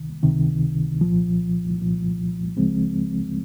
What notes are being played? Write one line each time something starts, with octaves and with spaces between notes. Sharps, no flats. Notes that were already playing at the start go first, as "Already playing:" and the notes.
Already playing: C#2 C3 D#3
C#2 C3 D#3
C2 A#2 F3
C2 A#2 F3
C#2 C#3 F3 G#3 C4